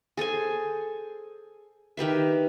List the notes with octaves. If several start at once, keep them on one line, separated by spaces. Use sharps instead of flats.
G#4 A4 C5 G#5
D#3 G4 B4 E5